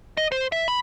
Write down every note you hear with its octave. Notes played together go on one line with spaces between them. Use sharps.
D#5
C5
E5
B5